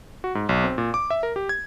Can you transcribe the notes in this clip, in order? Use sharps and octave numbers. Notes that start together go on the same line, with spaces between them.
F#4
G#2
B1
C4
A#2
D6
E5
A#4
G4
G#6